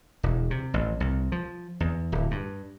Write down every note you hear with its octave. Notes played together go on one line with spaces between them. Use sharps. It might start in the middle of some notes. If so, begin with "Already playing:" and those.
E1
C3
A1
C2
F3
E2
D1
G2